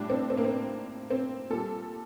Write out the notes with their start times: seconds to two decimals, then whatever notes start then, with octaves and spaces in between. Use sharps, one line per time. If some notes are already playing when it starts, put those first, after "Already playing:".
Already playing: A2 G3 D4
0.10 C4
0.30 C4
0.37 A#3
0.44 C4
1.10 C4
1.50 A#2 G3 A4